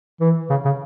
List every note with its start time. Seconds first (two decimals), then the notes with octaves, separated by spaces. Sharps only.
0.20 E3
0.50 C#3
0.65 C#3